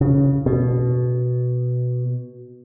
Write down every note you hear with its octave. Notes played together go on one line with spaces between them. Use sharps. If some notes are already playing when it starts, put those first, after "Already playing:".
C#3
B2